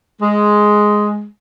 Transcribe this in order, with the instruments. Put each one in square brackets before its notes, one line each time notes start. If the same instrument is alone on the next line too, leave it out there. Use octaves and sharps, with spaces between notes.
[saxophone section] G#3